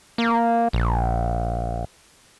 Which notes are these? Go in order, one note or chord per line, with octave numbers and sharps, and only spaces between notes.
A#3
A#1